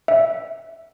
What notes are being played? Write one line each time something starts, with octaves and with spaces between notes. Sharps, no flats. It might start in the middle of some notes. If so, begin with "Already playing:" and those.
E5